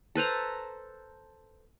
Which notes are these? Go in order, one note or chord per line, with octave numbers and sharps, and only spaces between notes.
A4 B4 C5 A#5